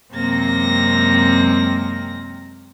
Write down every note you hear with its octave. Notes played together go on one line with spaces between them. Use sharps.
F#2 C3 G#3 A#3 C4 A#6